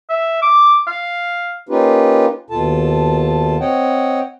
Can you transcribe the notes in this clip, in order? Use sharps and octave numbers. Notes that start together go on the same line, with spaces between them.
E5
D6
F5
A#3 C#4 D#4 F4 G4 B4
D#2 B2 F4 A4 A5
C4 C#5 D#5 F#5 G5